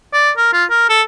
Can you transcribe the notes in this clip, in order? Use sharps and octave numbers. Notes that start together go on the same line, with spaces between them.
D5
A#4
F4
A#4
A4